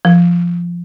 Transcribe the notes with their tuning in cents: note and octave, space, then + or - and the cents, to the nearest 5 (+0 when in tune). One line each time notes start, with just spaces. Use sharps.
F3 -10